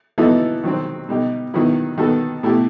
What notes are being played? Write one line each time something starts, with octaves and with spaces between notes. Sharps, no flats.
E3 B3 D#4 F#4 A4
D#3 F#3 C4
B2 G3 D#4 G4
D#3 F#3 B3 E4
D#3 G3 B3 F#4 A4
B2 A3 E4 G4